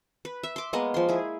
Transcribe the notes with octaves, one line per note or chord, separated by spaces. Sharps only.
B4
E5
C6 D6
G#3 A#3 B3 D#5
F3 C6
E4 G#4